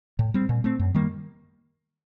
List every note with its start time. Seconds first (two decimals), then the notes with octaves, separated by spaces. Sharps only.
0.19 A2
0.34 G3 C4
0.49 A#2
0.64 A3 C4
0.79 F#2
0.94 D#3 G3 A#3